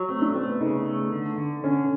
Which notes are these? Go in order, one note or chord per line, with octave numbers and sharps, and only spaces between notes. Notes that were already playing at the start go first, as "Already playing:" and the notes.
Already playing: F#3
A3 C4
D4
A3 C4
B3
C#3 D#4
A3
D3
D3
D3 C#4